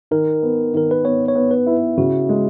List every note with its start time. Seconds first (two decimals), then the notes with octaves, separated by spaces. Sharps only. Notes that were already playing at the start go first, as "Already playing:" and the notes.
0.11 D#3 A#4
0.42 B3
0.74 D#3 A#4
0.91 B4
1.04 B3 C#5
1.28 C#5
1.35 B3
1.51 B4
1.66 E4
1.97 C#3 F#4
2.29 G#3